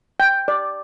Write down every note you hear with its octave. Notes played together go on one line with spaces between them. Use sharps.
G5
D5